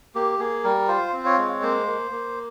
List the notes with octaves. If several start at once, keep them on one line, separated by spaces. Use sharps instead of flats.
A#3 G4
A#3 G#4
G3 A#4
F4 C5
C4
C#5
G#3
A#3 C5
A#3
A#3